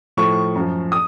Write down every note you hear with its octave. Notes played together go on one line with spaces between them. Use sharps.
A2 F3 C#6
F#2 F3
D#6